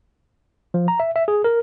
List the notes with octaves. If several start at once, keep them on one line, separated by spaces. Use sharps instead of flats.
F3
A#5
E5
E5
G#4
A#4